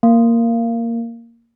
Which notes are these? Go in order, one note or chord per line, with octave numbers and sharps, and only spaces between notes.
A#3